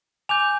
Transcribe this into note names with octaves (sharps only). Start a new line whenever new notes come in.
G#5 D6 G6 F7